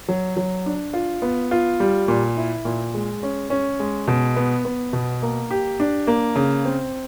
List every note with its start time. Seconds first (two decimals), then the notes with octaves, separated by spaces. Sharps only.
0.09 F#3
0.37 F#3
0.66 D4
0.93 F4
1.22 B3
1.51 F4
1.80 G3
2.08 A#2
2.37 E4
2.65 A#2
2.94 G#3
3.23 C#4
3.50 C#4
3.80 G#3
4.08 B2
4.36 B3
4.65 B3
4.93 B2
5.22 A#3
5.51 G4
5.80 D4
6.07 A#3
6.36 C#3
6.65 C4